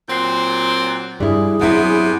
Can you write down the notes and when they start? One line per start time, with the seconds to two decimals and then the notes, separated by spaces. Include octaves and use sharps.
0.08 A#2 F#3 C4 G6 C7
1.20 G2 G3 E4 G#4
1.60 C3 F#3 B3 E4